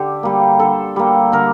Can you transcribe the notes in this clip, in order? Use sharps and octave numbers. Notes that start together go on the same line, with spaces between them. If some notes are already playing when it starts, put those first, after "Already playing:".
Already playing: D3 G4
G3 A#3
D3 A4
G3 A#3
D3 A#4